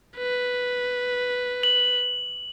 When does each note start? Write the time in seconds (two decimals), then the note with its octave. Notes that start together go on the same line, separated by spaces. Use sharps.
0.18 B4
1.63 F#7